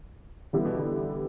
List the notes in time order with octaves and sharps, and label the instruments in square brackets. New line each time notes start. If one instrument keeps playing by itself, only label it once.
[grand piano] D3 [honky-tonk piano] E3 G3 B3 E4
[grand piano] B2
D3